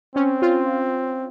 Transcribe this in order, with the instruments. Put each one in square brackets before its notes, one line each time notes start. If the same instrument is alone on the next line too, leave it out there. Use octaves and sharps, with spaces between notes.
[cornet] C4 [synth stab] C#4
[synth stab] F4